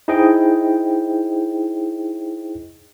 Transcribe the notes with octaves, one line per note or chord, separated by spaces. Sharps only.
D#4 E4 G#4 C5 D#5 G5